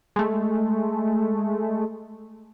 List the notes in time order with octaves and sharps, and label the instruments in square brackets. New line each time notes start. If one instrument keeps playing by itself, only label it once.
[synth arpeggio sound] G#3 A3